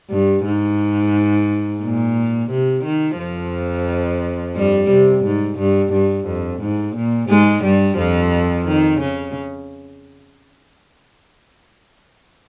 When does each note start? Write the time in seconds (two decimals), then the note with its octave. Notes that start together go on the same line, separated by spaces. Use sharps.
0.10 G2
0.45 G#2
1.82 A#2
2.50 C3
2.84 D#3
3.18 F2 F3
4.56 G2 G3
4.90 C3
5.24 G#2
5.58 G2
5.92 G2
6.27 F2
6.61 G#2
6.96 A#2
7.29 G#2 G#3
7.63 G2 G3
7.98 F2 F3
8.67 D#3
9.00 C#3